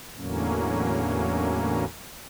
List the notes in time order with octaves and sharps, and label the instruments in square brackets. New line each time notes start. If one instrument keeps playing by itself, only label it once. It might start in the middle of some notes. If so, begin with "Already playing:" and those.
[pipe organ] E2 A2 D3 F#3 A#3 C#4